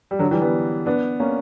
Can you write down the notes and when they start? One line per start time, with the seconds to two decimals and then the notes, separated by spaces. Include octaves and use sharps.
0.11 G3
0.19 D3 F#3
0.31 E3 G3
0.41 G3 B3
0.86 B3 D4
1.20 A#3 C#4